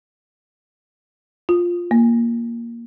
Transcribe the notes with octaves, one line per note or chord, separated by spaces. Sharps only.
F4
A#3